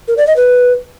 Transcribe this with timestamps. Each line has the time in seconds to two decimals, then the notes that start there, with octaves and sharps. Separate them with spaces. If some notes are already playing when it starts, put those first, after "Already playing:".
0.08 A#4
0.17 D5
0.27 D#5
0.36 B4